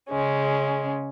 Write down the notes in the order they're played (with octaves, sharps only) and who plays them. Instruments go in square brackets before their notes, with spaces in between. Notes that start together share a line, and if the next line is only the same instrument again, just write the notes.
[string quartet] C#3 G#3 C#4